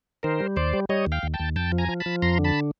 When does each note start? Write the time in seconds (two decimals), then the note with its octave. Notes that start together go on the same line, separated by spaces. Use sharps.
0.23 D#3 A#4 C5
0.40 G3
0.56 D#2 C5 D5
0.73 G3
0.89 G3 C#5 D#5
1.06 D#2
1.12 F5 G5
1.23 D#2
1.34 G5 A5
1.40 D#2
1.56 F2 G5 A5
1.72 F3
1.78 G#5 A#5
1.89 F3
2.00 A5 B5
2.06 F3
2.22 F2 A#5 C6
2.39 D3
2.44 A5 B5